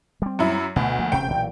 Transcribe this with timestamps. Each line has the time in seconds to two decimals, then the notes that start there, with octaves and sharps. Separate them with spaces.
0.22 G3 C4
0.39 F#2 E4
0.76 D2 B2
0.99 F3 A#3
1.12 E1 C3 C#4 G5
1.28 B1 A#2 E3